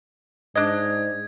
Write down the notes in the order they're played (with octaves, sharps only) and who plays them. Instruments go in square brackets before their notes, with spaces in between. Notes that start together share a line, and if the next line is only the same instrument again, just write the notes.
[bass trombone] G#2 [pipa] D4 D#5 [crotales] G#6